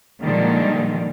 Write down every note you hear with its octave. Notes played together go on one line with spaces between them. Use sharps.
A#2 D3 D#3 F3 G3 G#3